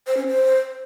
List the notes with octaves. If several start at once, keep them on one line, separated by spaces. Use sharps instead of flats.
C5
C#4
C5